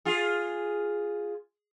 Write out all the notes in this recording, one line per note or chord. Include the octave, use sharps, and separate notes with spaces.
F4 G#4